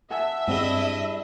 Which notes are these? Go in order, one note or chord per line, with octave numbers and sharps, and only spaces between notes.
E5 F#5 G#5 A5
G2 G3 C4 D4 E4 G#4 D#5 G7